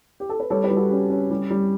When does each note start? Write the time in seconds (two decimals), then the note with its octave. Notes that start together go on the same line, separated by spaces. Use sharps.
0.20 G4
0.29 A4
0.40 B4
0.50 G3 A4 C#5
0.63 G4 B4
0.70 G3
0.76 F#4 A4
0.90 C#4 G4
1.10 C#4
1.30 G3
1.50 G3